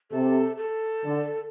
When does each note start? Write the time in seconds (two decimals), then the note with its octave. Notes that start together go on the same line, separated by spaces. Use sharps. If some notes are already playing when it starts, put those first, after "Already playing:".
0.11 C3 A4
0.57 A4
1.04 D3